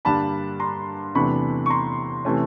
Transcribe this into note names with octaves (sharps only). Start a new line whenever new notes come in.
G2 D3 G3 A#3 D4 A5 B5
A#5 C6
E2 C3 E3 A3 D4 B5 C#6
C#6
A#5 C6
C3 E3 A3 C#4